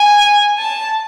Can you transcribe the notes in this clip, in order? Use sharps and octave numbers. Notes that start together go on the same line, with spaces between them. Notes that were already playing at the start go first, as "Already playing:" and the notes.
Already playing: G#5
A5